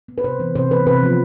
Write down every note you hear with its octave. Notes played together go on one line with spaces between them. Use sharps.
B3
B4
C3 C5
E3 B3
C3 C5
E3 B3 B4
C3 B4
F3 B3